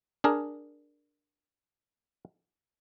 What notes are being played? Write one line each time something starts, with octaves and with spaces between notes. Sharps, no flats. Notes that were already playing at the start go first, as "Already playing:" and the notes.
D4 G#4 A#4